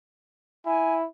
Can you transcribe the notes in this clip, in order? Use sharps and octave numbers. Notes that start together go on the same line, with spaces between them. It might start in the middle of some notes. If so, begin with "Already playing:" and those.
E4 G#5